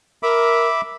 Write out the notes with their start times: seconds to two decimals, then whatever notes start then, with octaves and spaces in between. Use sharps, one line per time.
0.23 A#4 E5 B5 D6